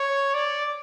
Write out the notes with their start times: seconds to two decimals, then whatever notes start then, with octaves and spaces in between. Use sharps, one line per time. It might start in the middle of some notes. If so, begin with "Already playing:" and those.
Already playing: C#5
0.34 D5